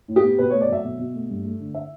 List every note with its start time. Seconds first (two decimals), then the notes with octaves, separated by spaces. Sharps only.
0.08 A2
0.16 G4
0.23 B3
0.38 B2 B4
0.50 A3 C#5
0.61 D5
0.69 F#3 E5
0.84 B2
0.99 B2
1.14 A3
1.29 G2
1.44 A3
1.60 D3
1.74 E5